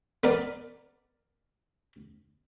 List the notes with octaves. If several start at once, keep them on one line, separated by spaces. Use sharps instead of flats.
B3 A#4 D5